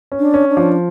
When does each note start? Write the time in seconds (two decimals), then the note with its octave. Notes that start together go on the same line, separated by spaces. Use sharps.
0.12 C#4
0.19 D4
0.34 C#4
0.49 D4
0.57 F3